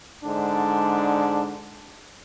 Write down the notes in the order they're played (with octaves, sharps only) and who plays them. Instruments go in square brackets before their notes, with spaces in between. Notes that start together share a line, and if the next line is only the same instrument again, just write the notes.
[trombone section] G#2 D3 D4